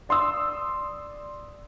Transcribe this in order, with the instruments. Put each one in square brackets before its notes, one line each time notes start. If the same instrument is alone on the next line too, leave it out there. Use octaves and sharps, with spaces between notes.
[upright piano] D5 C6 D#6 E6